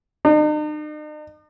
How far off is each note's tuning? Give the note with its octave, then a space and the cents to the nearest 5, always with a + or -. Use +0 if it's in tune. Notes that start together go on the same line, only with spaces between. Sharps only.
D#4 -45